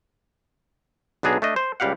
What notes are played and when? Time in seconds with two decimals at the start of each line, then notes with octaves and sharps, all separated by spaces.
1.23 B1 B3 D4 G#4 A#5
1.42 A3 D4 D#5
1.56 C5
1.80 C#2 G3 G4 F5 F#5